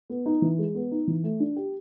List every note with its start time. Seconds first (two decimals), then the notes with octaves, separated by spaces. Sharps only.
0.10 B3
0.26 D#4
0.42 E3
0.59 G#3
0.75 B3
0.91 D#4
1.08 E3
1.24 A3
1.40 D4
1.56 G4